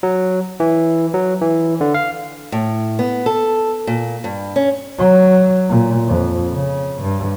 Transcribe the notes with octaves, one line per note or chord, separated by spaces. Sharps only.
F#3
E3
F#3
E3
D3
F5
A2
B3
A4
A#2
G2
C#4
F#3
A#2
F2
C#3
G2